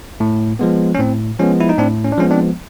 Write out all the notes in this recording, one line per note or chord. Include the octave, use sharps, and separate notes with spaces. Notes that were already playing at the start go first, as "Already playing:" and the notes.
A2
F3 G#3 B3
C#4
A2 C4
F3 G#3 B3 C#4
E4
D#4
A2 C4 D4
C#4
D4
F3 G#3 B3 C#4
C4 D4